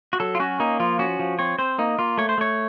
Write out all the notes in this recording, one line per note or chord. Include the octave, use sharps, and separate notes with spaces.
F#4
F#3 A4
F4
C#4 F#4
A#3 D#4
F3 F4
C#4 F#4
F3
C4 C#5
C4 C5
A#3 D#4
A#3 F4
A3 C#5
C5
A3 C#5